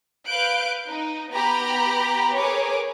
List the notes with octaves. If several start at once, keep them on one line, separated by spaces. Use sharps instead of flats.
B4 F5 F#6 G6 D7
D#4
B3 G4 A#5 B5
G#4 A#4 B4 C#5 D6